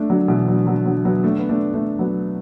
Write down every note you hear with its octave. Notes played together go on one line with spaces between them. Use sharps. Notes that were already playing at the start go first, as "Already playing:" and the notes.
Already playing: A3 D4
D3 F#3
B2 E3
D3 F#3
D3 F#3
D3 F#3
F#3 B3
A3 D4
B3
A3 D4
A3 D4
F#3 B3